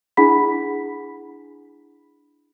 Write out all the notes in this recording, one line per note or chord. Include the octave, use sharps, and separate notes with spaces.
D4 E4 G#4 F#5 B5 B6